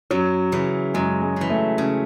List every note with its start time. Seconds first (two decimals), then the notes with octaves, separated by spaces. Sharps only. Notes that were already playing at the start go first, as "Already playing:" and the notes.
0.11 F#2 F#3
0.52 C#3 E3
0.94 F#2 G#3
1.22 G#3
1.36 C#3 E3
1.50 A3
1.78 C#3